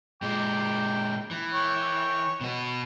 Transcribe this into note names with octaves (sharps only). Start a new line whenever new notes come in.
A#2 G#3 G5 D6
E3
C#5 G5
B2 B3